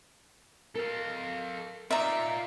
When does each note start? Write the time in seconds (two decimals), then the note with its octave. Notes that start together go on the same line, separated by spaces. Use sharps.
0.75 A4 A#4 F5
1.91 D#4 F4 D5 E5